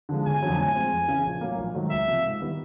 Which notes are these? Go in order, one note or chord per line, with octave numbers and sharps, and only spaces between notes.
D3 F3 G#3
G1 G#5
F2 D3 F#3
A2 G#5
F3 G#3 C4
F2
C#3 E3
A#1
A2 F#3 A#3
A#1
G#2 D#3 F#3 A3
C#2 E5
C3 F3 A#3
G#2
D#3 G3 B3 E4